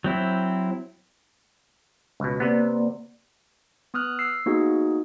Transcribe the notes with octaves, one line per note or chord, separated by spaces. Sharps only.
F#3 C4 E4
C#2 B2
C3 A#3 B3 D5
B3 D#6 F6 F#6
E6 C7
A#3 B3 D#4 F#4 G#4